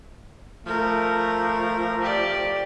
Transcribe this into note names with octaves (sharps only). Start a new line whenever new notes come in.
F3 A3 A#4
G4 D5